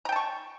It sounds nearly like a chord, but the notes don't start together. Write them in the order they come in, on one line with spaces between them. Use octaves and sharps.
A#5 G5 A5 C#6